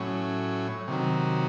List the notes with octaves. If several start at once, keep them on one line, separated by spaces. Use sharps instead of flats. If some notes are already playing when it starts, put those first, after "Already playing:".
Already playing: A2 F#3 C#4
C3 D#3 F#3